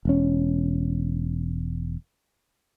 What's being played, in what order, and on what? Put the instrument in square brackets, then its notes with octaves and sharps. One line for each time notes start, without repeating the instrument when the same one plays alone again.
[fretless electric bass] E1 C#4